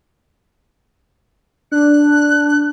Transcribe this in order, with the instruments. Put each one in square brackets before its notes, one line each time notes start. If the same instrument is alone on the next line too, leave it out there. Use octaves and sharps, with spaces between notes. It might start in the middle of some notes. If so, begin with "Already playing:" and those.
[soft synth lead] D4 [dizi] F#6